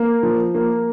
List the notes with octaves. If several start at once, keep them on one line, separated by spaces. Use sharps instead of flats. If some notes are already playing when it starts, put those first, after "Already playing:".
Already playing: A#3
F3
A#3